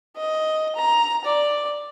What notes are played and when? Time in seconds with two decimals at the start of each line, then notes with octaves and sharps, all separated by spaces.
0.17 D#5
0.76 A#5
1.25 D5